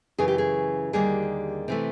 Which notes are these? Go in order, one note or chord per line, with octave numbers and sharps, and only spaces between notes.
F#2 C#3 E3 G#4
G4
G#4
D#2 D3 G3 A#3 G#4
C3 E3 A3